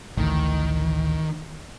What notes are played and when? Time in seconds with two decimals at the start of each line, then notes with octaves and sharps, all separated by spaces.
0.17 A1 D2 A2 D#3